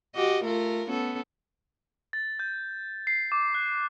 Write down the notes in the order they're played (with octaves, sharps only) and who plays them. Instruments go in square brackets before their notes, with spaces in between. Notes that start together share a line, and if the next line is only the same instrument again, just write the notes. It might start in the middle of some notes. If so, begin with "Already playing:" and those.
[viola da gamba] F#4 G4 D#5
A3 F4 A#4
B3 C#4 A4
[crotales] A6
G6
C7
D6
F#6